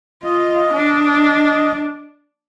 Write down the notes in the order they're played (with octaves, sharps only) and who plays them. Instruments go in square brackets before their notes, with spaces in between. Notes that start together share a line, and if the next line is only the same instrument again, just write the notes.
[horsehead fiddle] F4 [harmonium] D#5
[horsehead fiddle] D4